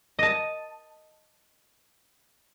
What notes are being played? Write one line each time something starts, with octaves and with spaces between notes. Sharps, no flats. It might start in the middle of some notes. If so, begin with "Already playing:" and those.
D#5 A5